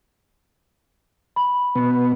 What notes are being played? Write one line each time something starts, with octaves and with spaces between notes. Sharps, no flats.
B5
B2 B3